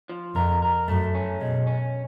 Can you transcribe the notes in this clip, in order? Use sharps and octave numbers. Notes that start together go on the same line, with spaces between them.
F3
F2 A#4
A#4
F#2 A3
C#4
B2 G#3
C#4